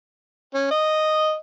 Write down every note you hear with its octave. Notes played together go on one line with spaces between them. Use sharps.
C#4
D#5